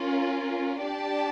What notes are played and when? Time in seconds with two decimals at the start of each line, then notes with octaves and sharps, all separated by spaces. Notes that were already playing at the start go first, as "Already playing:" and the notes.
Already playing: C#4 F4 A#4
0.81 D4 G4 D5 A5